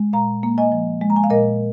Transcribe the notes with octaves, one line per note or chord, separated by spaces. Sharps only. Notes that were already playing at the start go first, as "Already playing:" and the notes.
Already playing: G#3
A#2 F5 A#5
A#3
D#5 G#5
F3
G#3
A#5
G#5
F5
A#2 A#4 D#5